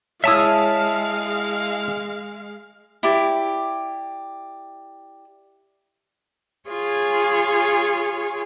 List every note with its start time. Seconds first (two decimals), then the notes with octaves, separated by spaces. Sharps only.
0.24 G#3 E4 C#5 E5 F5 A5 D#6
3.03 E4 G4 D5
6.69 F4 G#4 C#5 G#5